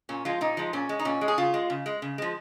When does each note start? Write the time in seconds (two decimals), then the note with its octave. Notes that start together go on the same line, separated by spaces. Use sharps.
0.09 A#2 C#4
0.25 F3 G#3 F4
0.41 A#2 D#4
0.57 F3 G#3
0.73 A#2 C#4
0.89 G#3
0.99 D#4
1.05 A#2 C#4
1.21 G#3
1.28 G#4
1.38 C#3 F4
1.54 G#3
1.70 C#3
1.86 G#3
2.02 C#3
2.18 F3 G#3